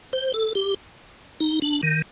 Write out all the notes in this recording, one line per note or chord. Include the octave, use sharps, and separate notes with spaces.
C5
A4
G4
D#4
D4
D#3